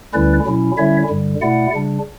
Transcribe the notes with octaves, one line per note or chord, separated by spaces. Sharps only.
D2 D3 G3 C#4 E4 B4 D5
B2 F#3 C#4 E4
D3 G3 C#4 E4 C#5 E5
G2 D3 G3
B2 A3 E4 D5 F#5
C#3 G3 D4